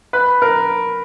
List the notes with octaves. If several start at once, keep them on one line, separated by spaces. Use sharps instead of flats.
B4
A#4